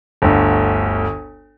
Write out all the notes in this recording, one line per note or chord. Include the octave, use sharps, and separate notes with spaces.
G1 D2